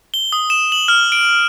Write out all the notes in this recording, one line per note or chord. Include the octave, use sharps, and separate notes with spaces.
G7
D#6
E7
F#7
F6
D7